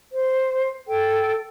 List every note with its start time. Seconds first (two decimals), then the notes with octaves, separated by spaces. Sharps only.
0.13 C5
0.88 A4 G5